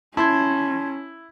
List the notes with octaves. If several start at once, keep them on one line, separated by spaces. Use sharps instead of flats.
C#4 E4 A5 C6 G#6